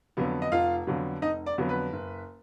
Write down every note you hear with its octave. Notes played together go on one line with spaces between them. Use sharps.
F2 D3 F#3 B3
D#5
F1 F4 F5
F2 D3 F#3 B3
F1 D#4 D#5
D5
F2 D3 F#3 B3
B4
F#1